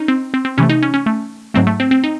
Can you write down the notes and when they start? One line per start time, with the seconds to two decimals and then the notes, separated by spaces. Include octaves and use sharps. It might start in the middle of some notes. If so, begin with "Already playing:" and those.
Already playing: C#4 D#4
0.08 C4
0.34 C4
0.45 C4
0.58 C3 E3 A3 C#4
0.70 D#4
0.83 C#4
0.94 C#4
1.06 A3
1.54 G#2 F#3 A3 C4
1.67 A3
1.80 C4
1.91 C4
2.04 D#4